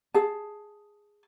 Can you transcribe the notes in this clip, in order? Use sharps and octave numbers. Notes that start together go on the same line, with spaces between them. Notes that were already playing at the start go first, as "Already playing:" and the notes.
G#4 A5